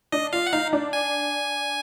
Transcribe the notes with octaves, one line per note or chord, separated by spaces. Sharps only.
D4 D#5
F4 F5
F#5
D#4 F5
D4
G#5